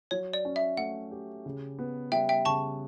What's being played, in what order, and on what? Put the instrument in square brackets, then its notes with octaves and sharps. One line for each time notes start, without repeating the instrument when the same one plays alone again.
[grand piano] F#3 [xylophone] C#5
[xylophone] D5
[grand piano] C#4
[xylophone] E5
[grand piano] A3 [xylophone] F#5
[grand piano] G4
C#3
B3
[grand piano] G3 [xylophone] E5 G5
[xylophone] E5 G5
[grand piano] C#3 [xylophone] A5 C#6